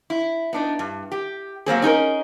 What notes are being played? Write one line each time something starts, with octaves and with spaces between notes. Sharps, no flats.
E4
B3 D4 D#4
G2
G4
F#3 A#3 C4 G#4
C#4 D#4 G#4 A#4